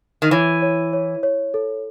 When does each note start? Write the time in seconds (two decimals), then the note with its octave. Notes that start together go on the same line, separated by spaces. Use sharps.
0.22 D#3
0.31 E3 C#5
0.62 C#5
0.93 C#5
1.23 C#5
1.54 A4